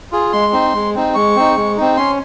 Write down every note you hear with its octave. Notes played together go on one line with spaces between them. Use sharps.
F4 G#4
G#3 C6
C4 D#4
G#3
C4 D#4
G#3 C#6
C4 D#4
G#3
C4 D#4
C#4 C6